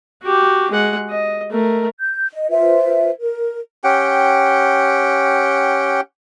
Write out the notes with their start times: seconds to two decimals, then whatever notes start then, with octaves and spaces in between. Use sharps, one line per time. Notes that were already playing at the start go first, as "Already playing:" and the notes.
0.23 F#4 G4
0.71 G#3 F#5
1.10 D#5
1.51 A3 A#4
2.00 G6
2.33 D#5
2.50 F4 B4 C5 E5
3.18 A#4
3.84 C#4 G4 F#5 G5